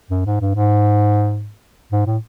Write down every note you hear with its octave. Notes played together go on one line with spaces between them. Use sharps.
F#2
G#2
G2
G#2
G#2
A2